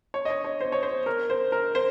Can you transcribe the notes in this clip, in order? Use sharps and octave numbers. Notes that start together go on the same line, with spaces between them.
C#5
D#5
C#5
C#5
C5
C#5
C5
A#4
C5
A#4
C5